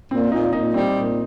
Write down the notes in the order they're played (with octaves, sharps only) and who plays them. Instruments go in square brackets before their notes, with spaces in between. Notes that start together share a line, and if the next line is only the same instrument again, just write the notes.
[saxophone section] A#2 [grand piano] C4
[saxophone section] A#2 [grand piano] D#4
[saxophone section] A#2 [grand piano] D#4
[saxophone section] G3 [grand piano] C4
[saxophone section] A#2